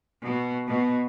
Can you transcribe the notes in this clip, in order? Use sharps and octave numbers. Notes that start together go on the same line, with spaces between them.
B2
B2